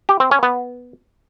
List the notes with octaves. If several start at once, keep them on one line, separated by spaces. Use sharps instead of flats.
G4
C4
C#4
B3